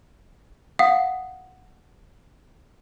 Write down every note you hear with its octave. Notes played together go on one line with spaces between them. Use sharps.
F5 F#5 D#6